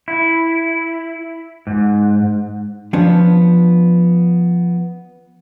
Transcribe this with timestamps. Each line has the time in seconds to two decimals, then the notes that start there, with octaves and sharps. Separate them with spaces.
0.08 E4
1.67 G#2
2.93 F3 B3 C#4 D4